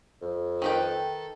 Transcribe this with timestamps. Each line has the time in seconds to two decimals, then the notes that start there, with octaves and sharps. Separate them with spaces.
0.22 F2
0.62 D#3 A4 B4 G5